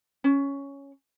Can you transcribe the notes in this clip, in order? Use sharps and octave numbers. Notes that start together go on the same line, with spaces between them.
C#4